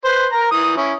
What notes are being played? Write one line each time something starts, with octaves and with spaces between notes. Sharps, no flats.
B4 C5
A#4 A#5
E3 D#6
C#4 E4